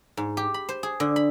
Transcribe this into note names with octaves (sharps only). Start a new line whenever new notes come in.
G#2
G4
B5
C5
G#4
D3
B5